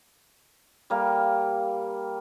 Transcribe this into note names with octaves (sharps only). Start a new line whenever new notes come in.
G3 A#3 F5